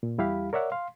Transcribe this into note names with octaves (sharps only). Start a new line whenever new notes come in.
A#2
E2 G3 E4 G4 F5 B5
A#4 C#5 D5 E5 F#5
F5 C6